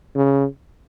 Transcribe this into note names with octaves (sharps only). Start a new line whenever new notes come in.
C#3